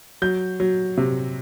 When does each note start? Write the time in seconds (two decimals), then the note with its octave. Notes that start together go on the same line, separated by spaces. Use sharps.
0.22 F#3 G6
0.60 F#3
0.98 C3